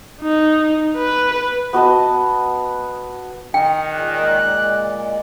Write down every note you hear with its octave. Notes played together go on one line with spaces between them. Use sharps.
D#4
B4
B3 F#4 D#5 A5
D#3 G5
A#2 G#3 D5 F#6